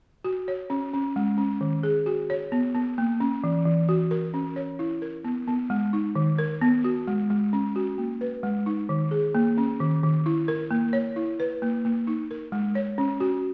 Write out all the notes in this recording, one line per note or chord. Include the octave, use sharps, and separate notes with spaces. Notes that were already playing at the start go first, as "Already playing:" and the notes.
F#4
C#5
C#4
C#4
G#3
C#4
D#3
G#4
F#4
C#5
B3
B3
A#3
C#4
E3
E3
F#4
A#4
C#4
C#5
E4
A#4
B3
B3
G#3
D#4
D#3
A#4
B3
F#4
G#3
G#3
C#4
F#4
A#3
B4
G#3
D#4
D#3
G#4
A#3
C#4
D#3
D#3
E4
A#4
A#3
C#5
E4
B4
A#3
A#3
D#4
A#4
G#3
C#5
C#4
F#4